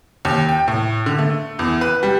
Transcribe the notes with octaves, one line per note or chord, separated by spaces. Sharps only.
D#2
G5
A2
D3
A3
E2
B4
G3